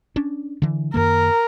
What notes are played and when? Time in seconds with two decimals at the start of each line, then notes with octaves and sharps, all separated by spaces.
0.16 C#4 D4
0.62 D3 E3
0.94 F#2 D#3 A#3 A#4